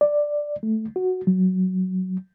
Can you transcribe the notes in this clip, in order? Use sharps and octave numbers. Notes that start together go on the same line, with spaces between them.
D5
A3
F#4
F#3